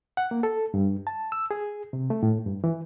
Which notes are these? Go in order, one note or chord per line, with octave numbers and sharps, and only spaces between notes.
F#5
A#3
A4
G2
A5
E6
G#4
C3
A3
A2
G2
E3